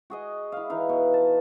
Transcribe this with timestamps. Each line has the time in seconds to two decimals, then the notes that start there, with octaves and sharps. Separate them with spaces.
0.10 F#4 G#4 D#5
0.52 E4 F5
0.70 E3 D#4 F5
0.89 B2
1.14 A5